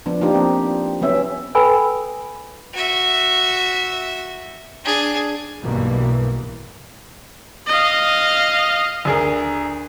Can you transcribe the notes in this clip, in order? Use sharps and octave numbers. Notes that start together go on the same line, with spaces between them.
F3 B3 D4
F3 A#3 D4 D#4 F4 G4
C4
F#3 B3 C#4 E5
A4 B4 G5 G#5 B5 E6
F#4 E5
D4 G#4
B1 G2 B2 E3 A#3
D#5 F5
D2 G#4 A#4